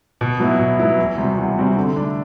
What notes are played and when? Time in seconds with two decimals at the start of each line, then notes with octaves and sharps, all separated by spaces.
0.21 B2
0.40 F#3 B3 E4
0.60 B2
0.79 F#3 B3 E4
0.98 E2
1.18 C3 G3 C4 F#4
1.38 E2
1.58 C3 G3 C4 F#4
1.77 D3
1.96 A3 D4